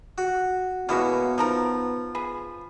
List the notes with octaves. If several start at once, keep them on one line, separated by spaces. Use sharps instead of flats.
F#4
B2 G#3 A#3 B3 C#4 E4 F#4
F3 D#4 A4 A#4
G#4 B4